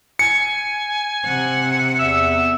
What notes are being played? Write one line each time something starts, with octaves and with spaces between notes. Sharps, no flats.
G#5 C#7
C3 F#5
E2 E5 E6